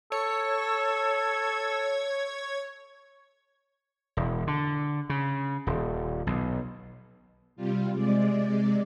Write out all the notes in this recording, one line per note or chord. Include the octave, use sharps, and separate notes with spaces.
A4 C#5
E1
D3
C#3
D#1
B1
C3 G3 F4
C3 G#3 D5